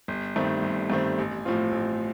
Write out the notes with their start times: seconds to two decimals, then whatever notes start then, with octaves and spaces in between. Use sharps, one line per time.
0.08 G1
0.36 G2 D#3 A3 C4
0.62 G1
0.90 G2 D#3 A3 C4
1.18 A1
1.45 A2 F3 C4 F4
1.72 A1